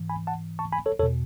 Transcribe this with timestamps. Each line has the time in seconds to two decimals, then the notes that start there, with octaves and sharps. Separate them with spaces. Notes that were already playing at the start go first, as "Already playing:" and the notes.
Already playing: G#2 E3
0.09 G#5 B5
0.27 F#5 A5
0.59 A5 C#6
0.72 G#5 B5
0.86 A4 C#5
0.99 E2 A4 C#5
1.03 B2